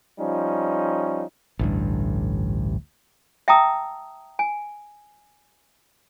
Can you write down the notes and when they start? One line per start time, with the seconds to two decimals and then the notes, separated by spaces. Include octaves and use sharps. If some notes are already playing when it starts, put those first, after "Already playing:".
0.19 F3 G3 C#4 D#4
1.59 A1 D2 G2
3.48 E5 G5 A5 A#5 D#6 E6
4.39 G#5